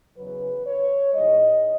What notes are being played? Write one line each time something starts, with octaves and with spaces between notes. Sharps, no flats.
E2 C#3 F#3 B4
C#5
G#2 E3 G#3 D#5